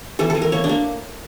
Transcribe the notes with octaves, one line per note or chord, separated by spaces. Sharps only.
E3 A4
A4
E3
A#4
A#3 C#5
D4
A#3